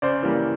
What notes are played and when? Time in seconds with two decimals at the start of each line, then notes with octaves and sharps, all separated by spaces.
0.02 C#3 C5 D5
0.23 E3 G3 A#3